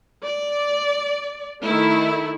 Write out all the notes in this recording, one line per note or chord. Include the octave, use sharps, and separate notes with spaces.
D5
D#3 A3 E4